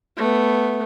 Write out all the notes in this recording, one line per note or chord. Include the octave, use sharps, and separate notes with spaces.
A3 B3